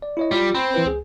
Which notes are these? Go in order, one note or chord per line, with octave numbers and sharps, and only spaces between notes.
D5
E4 C#5 D#5
G3 F4
C4 B5
E3 E4 B4
C#2 G#4